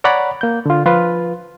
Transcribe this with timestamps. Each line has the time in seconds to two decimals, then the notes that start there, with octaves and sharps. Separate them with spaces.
0.04 C#5 D5 F#5 A#5 B5 D6
0.41 A#3 G6
0.66 D3 F4
0.86 F3 F4 B4